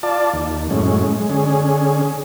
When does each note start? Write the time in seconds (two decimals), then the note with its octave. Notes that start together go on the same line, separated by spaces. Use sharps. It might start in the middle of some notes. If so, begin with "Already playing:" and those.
0.03 F4 D5 A5
0.34 D#2
0.70 F#2 A2 G#3 C#4
1.05 G#3
1.30 D3 C#4 G#4